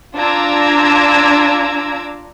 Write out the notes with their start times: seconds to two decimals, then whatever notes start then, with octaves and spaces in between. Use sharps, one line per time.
0.17 D4 F4 A#5 D6 E6 G#6